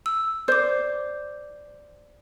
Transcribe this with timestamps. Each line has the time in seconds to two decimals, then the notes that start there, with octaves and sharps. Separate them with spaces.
0.06 E6
0.48 C5 D5 D6